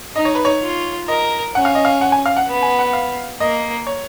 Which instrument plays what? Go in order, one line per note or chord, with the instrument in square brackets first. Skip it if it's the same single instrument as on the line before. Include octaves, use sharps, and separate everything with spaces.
[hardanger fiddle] D#4 [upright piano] D#5
[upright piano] C#5
B4
C#5
[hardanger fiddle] F4
[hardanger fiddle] A#4 [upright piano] D#5
[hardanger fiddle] C#4 [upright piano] F#5
[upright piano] F5
D#5
F5
F#5
G#5
F5
F#5
[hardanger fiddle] B3
[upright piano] G#5
F#5
F5
[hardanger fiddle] A#3 [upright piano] D#5
[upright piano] C#5